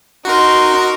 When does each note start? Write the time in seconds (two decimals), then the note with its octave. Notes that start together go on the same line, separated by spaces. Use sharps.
0.25 D#4 F#4 A#4 C6